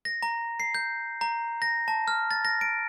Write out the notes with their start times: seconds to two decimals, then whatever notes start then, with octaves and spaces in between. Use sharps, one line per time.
0.05 A#6
0.22 A#5
0.60 C7
0.75 G6
1.21 A#5
1.62 A#6
1.88 A5
2.08 F6
2.31 A6
2.45 A#6
2.61 D7